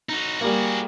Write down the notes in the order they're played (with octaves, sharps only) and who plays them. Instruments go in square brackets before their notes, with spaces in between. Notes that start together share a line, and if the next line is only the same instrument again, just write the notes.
[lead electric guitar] D#4 F#4
[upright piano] G3 A#3 [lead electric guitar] F#4 G#4